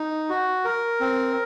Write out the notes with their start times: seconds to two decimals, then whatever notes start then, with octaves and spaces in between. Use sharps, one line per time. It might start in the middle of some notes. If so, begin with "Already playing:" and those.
Already playing: D#4
0.29 F#4
0.65 A#4
1.01 C4